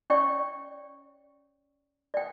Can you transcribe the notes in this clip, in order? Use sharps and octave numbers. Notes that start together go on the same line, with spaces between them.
C#4 C#5 D5 G5 C#6
D5 G5